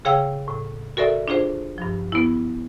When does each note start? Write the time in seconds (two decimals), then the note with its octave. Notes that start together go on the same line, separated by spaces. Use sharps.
0.05 C#3 G#4 C#5 F5 G5 E6
0.48 A2
0.97 F#4 A4 A#4 D5 E5
1.28 D4 F4 G#4 C5
1.78 G2 F3
2.12 B3 E4